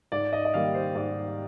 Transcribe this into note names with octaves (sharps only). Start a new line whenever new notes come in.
G#2 D5
D#5
D#5
D#3 G3 A#3 F5
C5
G#2 D5